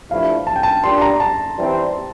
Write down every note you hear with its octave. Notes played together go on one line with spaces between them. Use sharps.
G2 F3 A3 E4 F5
A5
G5
A5
A#2 G3 D4 G4 C6
A#5
A5
E3 G3 C4